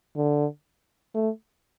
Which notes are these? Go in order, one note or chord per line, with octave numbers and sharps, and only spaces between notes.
D3
A3